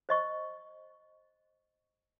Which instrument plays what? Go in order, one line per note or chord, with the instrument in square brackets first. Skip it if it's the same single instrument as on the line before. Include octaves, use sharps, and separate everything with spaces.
[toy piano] C5 D#5 C#6